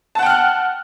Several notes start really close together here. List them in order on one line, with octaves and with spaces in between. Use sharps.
A5 F#5 G5 F6 F#6